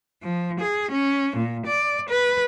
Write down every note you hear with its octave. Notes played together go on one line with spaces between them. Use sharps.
F3
G#4
C#4
A#2
D5
B4